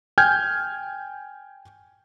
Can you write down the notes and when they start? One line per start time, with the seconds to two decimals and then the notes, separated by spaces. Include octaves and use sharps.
0.18 G5 G#5 F6 G6 G#6